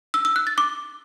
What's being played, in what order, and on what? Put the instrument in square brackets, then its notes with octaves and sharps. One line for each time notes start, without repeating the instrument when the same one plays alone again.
[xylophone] E6
E6
F#6
A6
D6